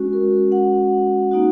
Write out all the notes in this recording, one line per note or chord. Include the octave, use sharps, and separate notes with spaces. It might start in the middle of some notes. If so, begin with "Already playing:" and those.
Already playing: G#3 C#4 F#4
A#4
F#5
A#3 D#4 F#4